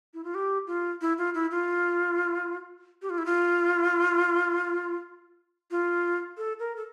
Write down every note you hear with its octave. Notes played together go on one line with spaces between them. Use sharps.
E4
F4
G4
F4
E4
F4
E4
F4
G4
F4
E4
F4
F4
A4
A#4
A4